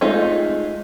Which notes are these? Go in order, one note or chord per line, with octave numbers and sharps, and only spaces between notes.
G#3 A3 D#4 F4